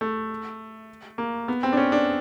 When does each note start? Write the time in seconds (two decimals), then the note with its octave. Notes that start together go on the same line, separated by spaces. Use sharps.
0.01 A3
1.18 A#3
1.48 B3
1.63 C4
1.73 D4
1.77 C#4
1.92 D4